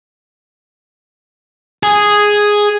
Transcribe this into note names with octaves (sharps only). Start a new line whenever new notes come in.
G#4